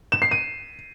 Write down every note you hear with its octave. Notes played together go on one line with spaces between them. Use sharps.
E7
C7
D#7